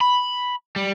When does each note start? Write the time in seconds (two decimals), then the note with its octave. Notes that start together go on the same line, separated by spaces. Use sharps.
0.01 B5
0.76 G3